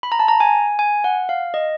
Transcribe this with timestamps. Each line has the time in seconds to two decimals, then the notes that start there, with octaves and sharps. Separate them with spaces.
0.03 B5
0.12 A#5
0.19 A5
0.28 A#5
0.40 G#5
0.79 G#5
1.04 F#5
1.29 F5
1.54 D#5